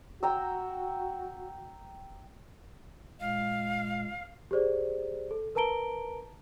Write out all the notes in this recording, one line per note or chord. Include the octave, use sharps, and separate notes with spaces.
F#4 G5 A#5 E6
A#2 G#3 F5
G4 G#4 C5 D5
A4
A#4 B4 A5 A#5 D7 G7